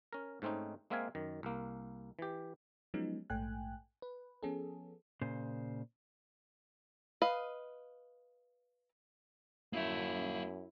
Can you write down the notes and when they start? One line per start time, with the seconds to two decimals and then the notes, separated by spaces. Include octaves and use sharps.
0.13 C#4 A#4
0.42 G#2 A3 C4 C#4 D#4
0.90 G#3 A#3 C4 E5 F5 G#5
1.15 F#2 D#3
1.43 C2 A#3
2.19 E3 G4
2.94 F3 F#3 G#3 B3 C#4 D#4
3.30 A#1 G#2 A3 G5 G#5 F#6
4.02 B4
4.43 F3 B3 C#4 G#4 A4
5.21 A#2 C#3 C5
7.22 B4 D#5 F5
9.73 F#2 A#3 E4 E5